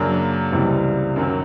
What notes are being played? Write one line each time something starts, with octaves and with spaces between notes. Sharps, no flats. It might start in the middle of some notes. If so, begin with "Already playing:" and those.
Already playing: F#2 C#3 F#3 A#3 D4
C#2 C3 E3 G3
F#2 D#3 F#3